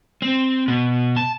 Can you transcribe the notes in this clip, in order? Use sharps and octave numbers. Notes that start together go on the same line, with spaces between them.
C4
B2
A5